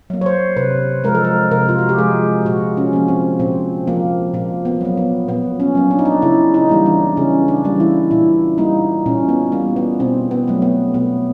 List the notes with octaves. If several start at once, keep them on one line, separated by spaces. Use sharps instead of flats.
F#3 A#3
C#5
C5
C3 B4
F3 G#3 A#4
A4
A#4
C3 A#4
F4
F#4
G4
F3 G#3 G#4
A#2 F#4
C#4
F3 A#3
C4
A#2 C4
F3 A#3
A#2 A#3
B3
F#3 A#3
B3
A#2 B3
C#4
F#3 A#3
D4
D#4
D4
C#3 E4
D#4
E3 G3 A#3
D4
C#3 C#4
D4
E3 G3 A#3
E4
A#2 E4
G3 A#3 D#4
A#2 C#4
B3
G3 A#3
B3
B2 C4
B3
F#3 A3
B3
B2 B3